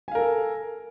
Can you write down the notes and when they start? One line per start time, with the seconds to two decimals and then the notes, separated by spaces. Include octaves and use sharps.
0.08 G#5
0.11 F5
0.15 A#4
0.19 A4